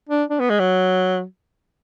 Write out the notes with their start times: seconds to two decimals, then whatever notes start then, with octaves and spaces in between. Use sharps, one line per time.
0.09 D4
0.30 D4
0.40 B3
0.50 G#3
0.60 F#3